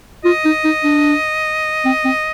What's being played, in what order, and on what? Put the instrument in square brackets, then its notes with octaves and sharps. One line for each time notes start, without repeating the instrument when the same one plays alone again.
[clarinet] F4 [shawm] D#5
[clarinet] D#4
D#4
D4
C4
C4